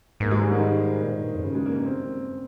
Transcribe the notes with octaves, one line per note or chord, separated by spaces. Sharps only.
G#2 A#3
G#3
G3
D#3
A#2
G#2
G2
F2
G2 C#3
G#3
A#3
A#3
C4